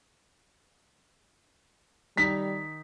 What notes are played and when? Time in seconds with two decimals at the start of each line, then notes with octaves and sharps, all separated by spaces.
2.17 D#3 G3 D#4 B6